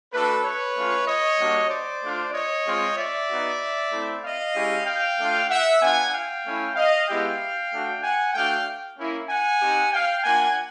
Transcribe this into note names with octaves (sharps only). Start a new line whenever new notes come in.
A3 D4 F#4 A4 B4
B4 C#5
A3 C#4 F4
C#5 D#5
G3 A#3 D4 F#4
C5 D5
A3 D4 F4
C#5 D#5
G#3 C4 F4
D5 E5
B3 D#4 F#4
A3 C4 E4
D#5 F5
G#3 C#4 E4 G4
F5 G5
A3 D4 F4
E5 F#5
B3 D4 F4 F#5 G#5
F5 G5
A3 C#4 E4
D#5 F5
G#3 B3 E4 G4 F5 G5
A3 D4 F#4
F#5 G#5
A3 D4 F#4 F5 G5
A#3 C#4 E4
F#5 G#5
C4 D#4 G4
F5 G5
A#3 D4 F4 F#5 G#5